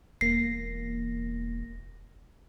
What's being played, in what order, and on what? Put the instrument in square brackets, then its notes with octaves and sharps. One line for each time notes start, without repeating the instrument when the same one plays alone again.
[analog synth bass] E1 [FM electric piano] A#3 A#6 [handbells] C7